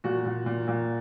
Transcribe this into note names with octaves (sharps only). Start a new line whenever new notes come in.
A#2 F#4
A#2
A#2
A#2